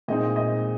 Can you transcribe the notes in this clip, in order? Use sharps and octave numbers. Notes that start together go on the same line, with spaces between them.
A#2 G#3 C4 D#4 D#5
D#5